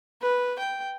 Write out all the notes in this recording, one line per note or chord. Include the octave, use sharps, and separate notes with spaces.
B4
G5